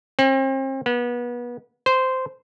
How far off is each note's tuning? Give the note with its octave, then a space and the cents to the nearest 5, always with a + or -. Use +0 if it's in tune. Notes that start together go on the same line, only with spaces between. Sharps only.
C4 +40
B3 -30
C5 -10